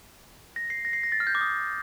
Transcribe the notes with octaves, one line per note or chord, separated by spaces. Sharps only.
A#6
C7
A#6
C7
A#6
A6
F6
G6
D6
D#6